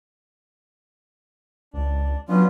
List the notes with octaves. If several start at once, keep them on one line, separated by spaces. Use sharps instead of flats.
C#2 D4
F#3 B3 C#4 D4 F4